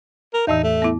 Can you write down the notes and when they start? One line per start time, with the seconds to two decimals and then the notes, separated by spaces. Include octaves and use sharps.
0.34 A#4
0.47 E2 A2 E3 D#4
0.63 A3
0.82 B3 E4